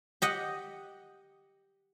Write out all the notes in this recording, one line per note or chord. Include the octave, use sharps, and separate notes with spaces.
G4 D#5 F#5